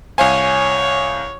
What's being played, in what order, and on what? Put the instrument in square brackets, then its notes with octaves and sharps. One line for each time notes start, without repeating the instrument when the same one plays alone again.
[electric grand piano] C2 F5 G#5 [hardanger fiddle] C#5